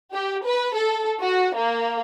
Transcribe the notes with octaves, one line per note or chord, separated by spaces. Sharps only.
G4
B4
A4
F#4
A#3